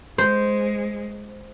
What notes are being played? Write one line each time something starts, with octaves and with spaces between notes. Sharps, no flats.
G#3 C5